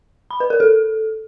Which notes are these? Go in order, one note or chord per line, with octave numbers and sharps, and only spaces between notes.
B5
B4
A#4
A4